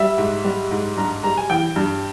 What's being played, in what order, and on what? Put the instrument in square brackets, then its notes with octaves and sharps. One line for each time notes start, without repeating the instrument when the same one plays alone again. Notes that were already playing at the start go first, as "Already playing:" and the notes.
Already playing: [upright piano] G3 E5
G#2
G3
G#2
G2 A#5
G3 A#5
G#5
E3 G5
G2